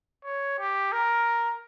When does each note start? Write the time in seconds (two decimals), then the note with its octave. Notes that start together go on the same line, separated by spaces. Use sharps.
0.25 C#5
0.59 G4
0.92 A#4